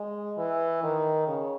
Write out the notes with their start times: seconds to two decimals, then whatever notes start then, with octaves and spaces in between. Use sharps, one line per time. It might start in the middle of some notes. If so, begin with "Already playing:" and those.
Already playing: G#3
0.38 E3
0.83 D#3
1.27 C#3